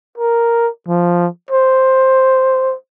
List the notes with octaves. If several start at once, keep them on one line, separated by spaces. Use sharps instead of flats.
A#4
F3
C5